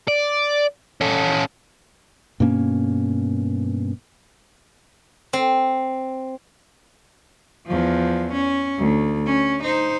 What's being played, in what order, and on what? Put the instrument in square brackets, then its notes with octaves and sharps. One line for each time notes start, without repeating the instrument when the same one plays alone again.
[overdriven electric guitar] D5
C#4 A4
[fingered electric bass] G2 B2 A#3 C#4
[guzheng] C4
[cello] E2 F3
C#4
D2
C#4
D#4 C5